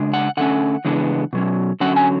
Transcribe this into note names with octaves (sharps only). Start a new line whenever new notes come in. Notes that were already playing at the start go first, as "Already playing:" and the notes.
Already playing: C#3 G#3 D4
F#5
D3 A3 C#4 F#5
C#3 E3 G#3 B3 D4
B2 F#3 C#4
D3 F#3 C#4 F#5
G#5